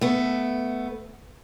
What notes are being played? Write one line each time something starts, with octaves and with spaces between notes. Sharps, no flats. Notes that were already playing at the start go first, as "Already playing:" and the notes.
A3 B3